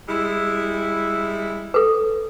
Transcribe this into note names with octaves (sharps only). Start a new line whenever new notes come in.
G3 G#3 E4
A4 B4